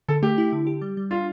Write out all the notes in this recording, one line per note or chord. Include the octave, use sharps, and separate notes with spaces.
D3 A4
A3 G4
E4
D3
G4
G3
G3
D4 F4